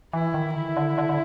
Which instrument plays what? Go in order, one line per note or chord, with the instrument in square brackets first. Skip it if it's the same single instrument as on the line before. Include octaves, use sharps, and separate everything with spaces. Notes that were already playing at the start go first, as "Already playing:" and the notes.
[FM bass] E3 [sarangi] E4
[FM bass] D#3
[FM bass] D3 [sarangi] E4
[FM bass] D3
D3
D3